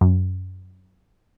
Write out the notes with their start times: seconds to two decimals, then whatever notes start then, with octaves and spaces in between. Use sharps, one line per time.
0.01 F#2